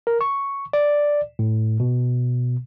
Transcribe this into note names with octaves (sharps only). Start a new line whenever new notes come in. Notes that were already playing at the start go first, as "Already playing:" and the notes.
A#4
C#6
D5
A2
B2